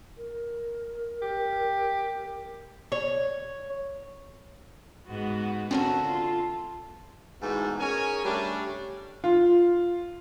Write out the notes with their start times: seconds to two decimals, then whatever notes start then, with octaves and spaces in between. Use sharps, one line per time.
0.18 A#4
1.22 G4
2.92 C#5
5.08 G#2 B3 F#4
5.71 D3 C4 C#4 F#4 A4 A#4
6.06 F4
7.41 G#2 B2 E3 A3
7.79 C#4 G#4 A#4 C#5 G#5
8.24 G3 A3 C#4 D4
9.24 F4